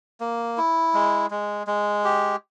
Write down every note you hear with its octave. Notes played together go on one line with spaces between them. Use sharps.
A#3
E4
G#3
G#3
G#3
G4